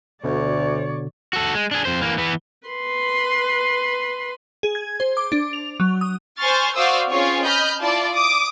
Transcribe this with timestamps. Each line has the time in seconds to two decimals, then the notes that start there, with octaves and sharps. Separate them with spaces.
0.24 D2 B2 D3 C#5 D5
1.33 F#4 A4
1.54 G#3
1.71 D4 G#4
1.85 F2 C5
2.01 E3 A#3
2.18 E3 B3
2.67 B4 C6
4.63 G#4
4.75 G#6
5.00 C5
5.17 D6
5.32 D4
5.53 F7
5.80 F#3
6.01 D#6
6.38 C5 G#5 C6 C#6 F6 A6
6.75 F#4 C5 D5 F5 D#6 E6
7.10 C4 C#4 F4 G#4 C#5
7.44 D#5 B5 F6 G6
7.81 E4 F4 D5 A5
8.14 D6 D#6